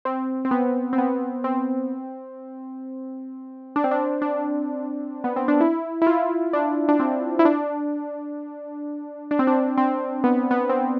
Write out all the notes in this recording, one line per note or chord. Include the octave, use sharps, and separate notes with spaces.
C4
C4
B3
C4
B3
C4
D4
C4
D4
D4
B3
C4
D4
E4
E4
F4
D4
D4
C4
E4
D4
D4
C4
D4
C4
B3
B3
C4